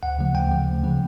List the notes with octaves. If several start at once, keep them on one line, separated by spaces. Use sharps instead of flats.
D2 F#5
C#3 F3 A3
D2 G5
C#3 F3 A3
D2
C#3 F3 A3